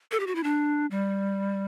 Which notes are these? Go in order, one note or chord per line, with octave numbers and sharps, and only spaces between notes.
A4
G4
F#4
E4
D4
G3